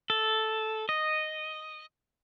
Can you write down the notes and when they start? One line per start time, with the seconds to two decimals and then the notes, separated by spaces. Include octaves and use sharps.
0.10 A4
0.89 D#5